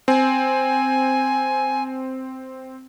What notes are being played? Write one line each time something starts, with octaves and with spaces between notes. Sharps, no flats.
C4 G#5